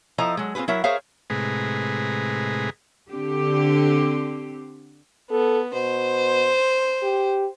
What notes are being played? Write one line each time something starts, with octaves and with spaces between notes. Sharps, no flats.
F3 E4 A4 C5 D#5 A#5
F#3 G#3
C4 F4 F#4 G#4 B4
F#3 E4 A#4 E5
G#4 A#4 C5 C#5 E5 F5
A2 C3 G#3 G#4 B4 A#5
D3 C4 G4
B3 A4
B2 C5
G4